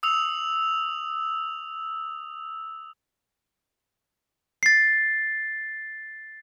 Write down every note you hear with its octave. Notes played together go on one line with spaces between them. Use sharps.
D#6 E6 F7
A6 C7